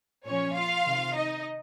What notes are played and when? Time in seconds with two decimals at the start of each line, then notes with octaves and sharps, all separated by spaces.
0.26 A#2 F3 C#4 C#5
0.56 F4 F5
0.86 C3 D#3
1.15 D#4 D#5